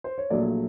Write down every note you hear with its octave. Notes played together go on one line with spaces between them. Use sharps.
C5
C#5
A#1 A#2 F#3 A3 D5